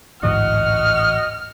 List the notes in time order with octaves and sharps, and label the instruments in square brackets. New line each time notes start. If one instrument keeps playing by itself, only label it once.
[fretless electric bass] A1 [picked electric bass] D2 G#2 E3 [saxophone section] F#4 D#5 [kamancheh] F6